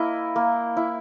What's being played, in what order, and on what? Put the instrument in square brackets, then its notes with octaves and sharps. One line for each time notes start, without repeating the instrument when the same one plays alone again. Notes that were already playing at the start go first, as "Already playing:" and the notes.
Already playing: [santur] A#3 E4 D#5
A#3
E4